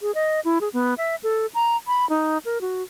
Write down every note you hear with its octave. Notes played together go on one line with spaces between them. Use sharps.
G#4
D#5
E4
G#4
B3
E5
A4
A#5
B5
D#4
A#4
F#4